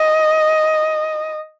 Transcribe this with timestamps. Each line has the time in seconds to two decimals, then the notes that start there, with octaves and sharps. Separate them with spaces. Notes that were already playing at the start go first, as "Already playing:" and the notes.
Already playing: D#5